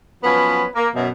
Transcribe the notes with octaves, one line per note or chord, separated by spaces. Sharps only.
F3 F#3 B3 C#4 B4
A#3
F#2 B2